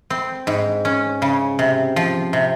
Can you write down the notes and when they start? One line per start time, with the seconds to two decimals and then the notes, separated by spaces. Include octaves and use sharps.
0.10 C4
0.47 G#2
0.85 C#4
1.22 C#3
1.59 C3
1.96 F3
2.33 C3